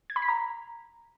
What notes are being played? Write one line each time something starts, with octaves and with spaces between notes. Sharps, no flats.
G#6
B5
B6
A#5